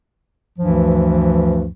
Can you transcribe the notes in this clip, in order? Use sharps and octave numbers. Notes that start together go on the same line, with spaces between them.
D2 G2 E3 F3